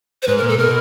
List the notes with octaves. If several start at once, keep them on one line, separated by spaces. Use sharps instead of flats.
C5
G#2 B4
A#4
A#2
A4
B2 A#4